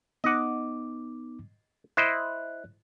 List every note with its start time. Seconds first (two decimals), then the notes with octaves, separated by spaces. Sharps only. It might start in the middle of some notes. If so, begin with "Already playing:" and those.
0.24 B3 D#4 D#5 F#5 D6
1.97 E4 C5 D#5 F#6